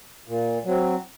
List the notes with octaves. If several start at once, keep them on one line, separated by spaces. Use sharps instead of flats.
A#2
F#3 C4